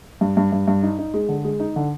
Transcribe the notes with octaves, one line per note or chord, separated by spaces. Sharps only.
G2
G2
G2
G2
D#4
D#4
G#3
D3
G#3
D#4
D3